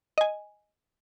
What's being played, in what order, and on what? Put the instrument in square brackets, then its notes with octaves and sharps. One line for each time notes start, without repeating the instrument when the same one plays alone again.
[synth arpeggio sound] D#5 G#5